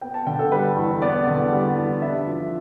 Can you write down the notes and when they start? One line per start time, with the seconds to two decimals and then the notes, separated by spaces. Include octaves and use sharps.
0.01 B3 G5
0.14 A5
0.27 D3 G5
0.39 A4
0.52 G3 B4
0.77 E2
1.02 B3 D5
1.27 D3
1.52 G3
1.77 E2
2.02 D4 E5
2.27 F3